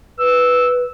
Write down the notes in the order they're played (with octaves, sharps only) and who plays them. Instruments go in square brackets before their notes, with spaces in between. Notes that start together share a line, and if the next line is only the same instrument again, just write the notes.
[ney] B4 [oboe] E6